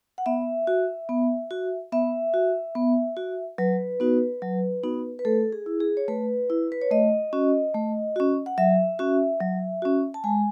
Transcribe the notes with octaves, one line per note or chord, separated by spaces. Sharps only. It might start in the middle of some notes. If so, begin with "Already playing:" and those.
F#5
B3 E5
F#4
B3
F#4
B3 E5
F#4
B3
F#4
F#3 B4
B3 D#4 F#4
F#3
B3 D#4 F#4
B4
A3 A4
G#4
E4
G#4
C#5
A3 B4
E4
B4
C#5
A3 D#5
C#4 F#4
A3
C#4 F#4
F#5
F#3 E5
C#4 F#4
F#3
C#4 F#4
A5
G#3 G#5